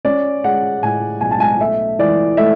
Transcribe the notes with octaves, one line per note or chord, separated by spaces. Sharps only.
C#4 D5
G#3 F#5
A2 G#5
B1 G#5
A5
G#5
A3 E5
E3 D5
A3 E5